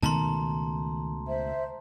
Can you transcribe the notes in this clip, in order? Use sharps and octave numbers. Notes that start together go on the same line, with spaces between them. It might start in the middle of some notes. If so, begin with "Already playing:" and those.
C#2 B2 D#3 A3 A5 A#5 C6
C5 E5